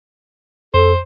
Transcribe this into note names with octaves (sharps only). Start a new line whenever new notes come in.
F2 A4 C5